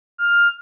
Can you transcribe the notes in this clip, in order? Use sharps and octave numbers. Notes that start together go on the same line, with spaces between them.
F6